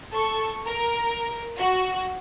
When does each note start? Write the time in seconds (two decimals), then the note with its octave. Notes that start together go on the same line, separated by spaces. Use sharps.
0.13 A4 C#6
0.65 A#4
1.60 F#4